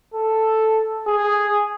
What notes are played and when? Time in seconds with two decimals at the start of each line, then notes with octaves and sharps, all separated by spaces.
0.14 A4
1.07 G#4